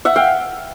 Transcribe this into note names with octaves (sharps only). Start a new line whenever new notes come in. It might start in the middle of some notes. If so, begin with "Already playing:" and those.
E5 F#5
F5 G5